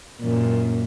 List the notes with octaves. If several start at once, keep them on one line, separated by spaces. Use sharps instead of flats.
F#2 A#2